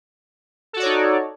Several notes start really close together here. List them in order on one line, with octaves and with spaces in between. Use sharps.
A4 F#4 D5 C#5 D#4